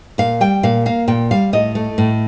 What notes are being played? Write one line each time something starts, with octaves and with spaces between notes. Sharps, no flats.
A#2 F5
G3 G5
A#2 F5
A#3 F5
A#2 G5
G3 F5
A2 D#5
A3
A2